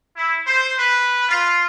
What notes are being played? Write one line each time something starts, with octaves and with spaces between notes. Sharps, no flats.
E4
C5
B4
F4